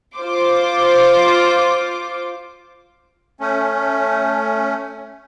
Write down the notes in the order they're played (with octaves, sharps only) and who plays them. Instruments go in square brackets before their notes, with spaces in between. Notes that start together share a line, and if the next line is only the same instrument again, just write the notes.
[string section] F4 C5 D6
[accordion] A3 C#4